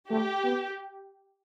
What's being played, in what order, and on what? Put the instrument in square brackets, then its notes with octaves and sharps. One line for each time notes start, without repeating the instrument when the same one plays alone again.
[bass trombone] A3 [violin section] G4
[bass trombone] B3